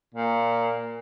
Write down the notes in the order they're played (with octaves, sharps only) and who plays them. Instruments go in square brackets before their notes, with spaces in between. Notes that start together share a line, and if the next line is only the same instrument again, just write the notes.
[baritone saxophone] A#2